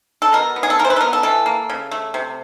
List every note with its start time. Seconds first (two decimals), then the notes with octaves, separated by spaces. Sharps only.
0.22 A4
0.33 B2 A#4
0.56 B3
0.63 G#4
0.70 A4
0.79 E3 A#4
0.85 C5
0.90 B4
0.96 A4
1.01 B3 A#4
1.13 A4
1.23 E3 A4
1.46 A#3
1.70 C#3
1.91 A3
2.14 C3